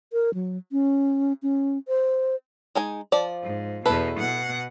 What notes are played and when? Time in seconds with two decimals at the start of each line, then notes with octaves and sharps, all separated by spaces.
0.13 A#4
0.34 F#3
0.72 C#4
1.42 C#4
1.88 C5
2.75 G#3 D#4 G#5
3.12 F3 D5
3.43 G#2
3.86 E2 B2 E4 A4 B4
4.19 B2 F#5